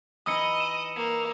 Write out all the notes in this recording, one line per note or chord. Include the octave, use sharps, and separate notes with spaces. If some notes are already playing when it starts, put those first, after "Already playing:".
E3 D#4 D#5 D#6 E6 C#7
E7
A#3